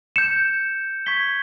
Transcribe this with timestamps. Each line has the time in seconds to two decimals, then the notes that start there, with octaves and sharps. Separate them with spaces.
0.16 G6 C#7 E7
1.06 C#6 G#6 B6 G7